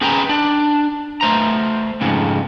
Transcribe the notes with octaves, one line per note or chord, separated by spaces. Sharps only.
C#4 G#4 B4 G5 G#5 A#5
D4
A3 C5 A#5
F2 G#2 C#3